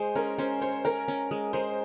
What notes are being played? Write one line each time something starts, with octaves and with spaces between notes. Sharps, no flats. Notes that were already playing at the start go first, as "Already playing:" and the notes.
Already playing: G#3 G#4 C5
C#4 A#4
C#4 C5
C5 C#5
C#4 A#4
C#4
G#3
G#3 C5